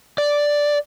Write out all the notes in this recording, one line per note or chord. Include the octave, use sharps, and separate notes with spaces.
D5